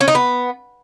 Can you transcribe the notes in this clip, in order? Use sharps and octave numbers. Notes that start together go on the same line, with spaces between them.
C#4
D#4
B3